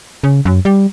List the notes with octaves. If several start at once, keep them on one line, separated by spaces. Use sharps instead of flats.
C#3
F#2
G3